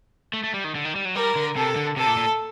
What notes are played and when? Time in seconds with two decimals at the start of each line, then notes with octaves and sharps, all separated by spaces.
0.33 A3
0.44 A3
0.54 G3
0.64 D#3
0.75 D3
0.85 D#3
0.96 G3
1.05 F#3
1.15 G3 A#4
1.36 D3
1.56 C3 A4
1.76 D3
1.97 C3 A4
2.06 A#2
2.17 A#2